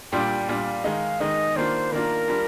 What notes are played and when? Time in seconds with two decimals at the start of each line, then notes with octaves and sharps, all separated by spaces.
0.12 A#2 G3 D4 F4 G5
0.49 A#2 G3 D4 F4 F5
0.84 D#3 G#3 D#4
1.20 D#3 G#3 D#4 D#5
1.56 D#3 A#3 D4 F4 C5
1.92 D#3 A#3 D4 F4 A#4
2.28 G3 D4 F4